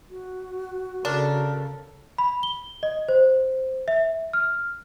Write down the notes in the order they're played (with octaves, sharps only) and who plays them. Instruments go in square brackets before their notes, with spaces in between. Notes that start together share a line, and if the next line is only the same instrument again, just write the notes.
[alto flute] F#4
[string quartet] C#3 A4 [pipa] D4 [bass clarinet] A#4
[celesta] B5
G7
D#5
C5
E5
F6